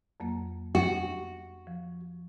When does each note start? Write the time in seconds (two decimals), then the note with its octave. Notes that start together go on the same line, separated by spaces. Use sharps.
0.20 F2 F#3 A#3
0.75 F#4
1.67 F3